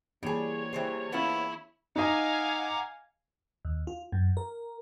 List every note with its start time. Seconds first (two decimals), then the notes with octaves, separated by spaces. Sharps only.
0.23 C3 E3 G3 A#3 D4 G#4 C#5
0.73 E3 G3 G#4 C5
1.12 B3 C#4 E4 F4
1.96 D#4 D#5 F5 F#5 G#5 A#5 D6
3.65 D#2
3.87 F4
4.12 F#2
4.37 A#4